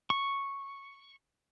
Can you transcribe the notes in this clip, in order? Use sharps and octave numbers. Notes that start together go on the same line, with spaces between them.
C#6